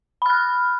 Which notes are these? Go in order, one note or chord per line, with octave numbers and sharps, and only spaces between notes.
B5 F6 F#6